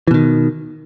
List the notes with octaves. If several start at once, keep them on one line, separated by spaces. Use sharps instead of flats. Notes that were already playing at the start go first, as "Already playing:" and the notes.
B2 D#3 E3